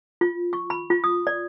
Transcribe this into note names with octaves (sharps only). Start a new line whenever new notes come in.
F4
C#6
B5
F4
D#6
D5